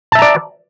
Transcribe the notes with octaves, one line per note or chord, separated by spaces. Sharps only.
D5 E5 A5 A#5